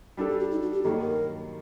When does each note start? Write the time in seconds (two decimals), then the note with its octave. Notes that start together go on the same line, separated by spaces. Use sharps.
0.17 G3 D4 F#4 A4
0.29 G4
0.40 F#4
0.51 D#4
0.62 F#4
0.73 G4
0.84 G2 D#3 F#3 A#3 A4
1.01 A#4